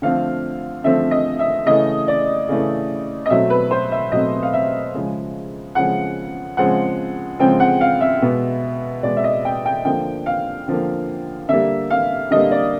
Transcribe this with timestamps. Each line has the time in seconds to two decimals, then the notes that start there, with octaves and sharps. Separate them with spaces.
0.02 D3 F3 A3 C4 F5
0.84 D3 F3 A3 C4 E5
1.11 D#5
1.39 E5
1.66 C#3 E3 A3 D#5
2.08 D5
2.49 C#3 E3 A3
3.26 D#5
3.30 B2 F#3 A3 C4 E5
3.50 B4
3.71 C5
3.92 E5
4.12 B2 F#3 A3 C4 D#5
4.43 F5
4.53 E5
4.94 C#3 F3 G#3
5.75 C#3 F3 G#3 F#5
6.57 C#3 F3 G#3 C4 F#5
7.39 C#3 F3 G#3 C4 G5
7.60 F#5
7.81 F5
8.01 E5
8.22 B2 G#3 B3
9.03 B2 G#3 B3 D5
9.17 E5
9.24 D#5
9.45 G5
9.66 G5
9.85 D3 F3 A#3 G5
10.26 F5
10.68 D3 F3 A#3
11.49 D3 G3 A#3 E5
11.90 F5
12.31 D3 G3 A#3 D#5
12.51 D5